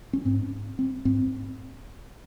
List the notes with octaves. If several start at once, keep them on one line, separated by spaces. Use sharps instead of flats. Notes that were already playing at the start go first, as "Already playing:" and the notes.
C#4
G#2 C4
C4
G#2 C4